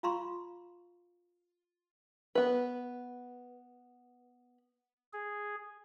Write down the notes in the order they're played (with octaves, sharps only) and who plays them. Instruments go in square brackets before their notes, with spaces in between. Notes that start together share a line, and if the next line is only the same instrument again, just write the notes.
[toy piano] F4 F5 A#5 C6 C#6
[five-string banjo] B3 B4
[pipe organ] G#4